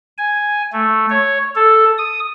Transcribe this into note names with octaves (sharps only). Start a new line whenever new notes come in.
G#5
A3
C#5
A4
D#6